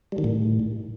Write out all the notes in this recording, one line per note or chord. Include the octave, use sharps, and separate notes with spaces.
G3
D#3
A2